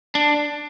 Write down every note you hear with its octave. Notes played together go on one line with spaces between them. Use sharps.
D4